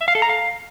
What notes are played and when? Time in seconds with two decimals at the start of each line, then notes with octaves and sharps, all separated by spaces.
0.01 E5
0.08 F5
0.15 A4
0.22 A#5
0.29 F5